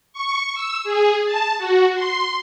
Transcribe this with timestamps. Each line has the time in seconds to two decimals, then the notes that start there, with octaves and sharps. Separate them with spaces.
0.13 C#6
0.54 E6
0.84 G#4
1.26 A5
1.58 F#4
1.95 C6